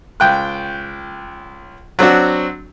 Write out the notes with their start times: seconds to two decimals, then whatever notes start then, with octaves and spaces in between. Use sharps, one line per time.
0.20 C#2 G5 F#6
1.99 F#3 C4 D4 F#4